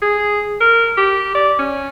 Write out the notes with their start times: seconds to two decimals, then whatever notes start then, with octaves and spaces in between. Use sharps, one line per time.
0.02 G#4
0.60 A#4
0.97 G4
1.34 D5
1.59 C#4